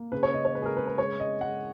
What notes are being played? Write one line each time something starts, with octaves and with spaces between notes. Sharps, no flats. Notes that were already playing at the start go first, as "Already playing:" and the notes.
Already playing: A#3
C#3 B4
C#5
C#3 D#5
C#5
G#3 B4
G#4
A#4
C#3 B4
B4
G#3 C#5
G#3 D#5
G#3 F#5